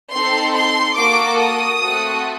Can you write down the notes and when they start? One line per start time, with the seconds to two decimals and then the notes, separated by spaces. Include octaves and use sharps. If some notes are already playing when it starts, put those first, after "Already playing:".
0.12 C4 D#4 A4 C6
0.55 C6
0.97 A#3 F#4 A4 D6
1.40 D#6
1.82 A3 C4 F#4 A4